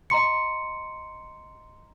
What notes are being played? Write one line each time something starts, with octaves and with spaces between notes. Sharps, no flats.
D#5 A#5 C6 C#7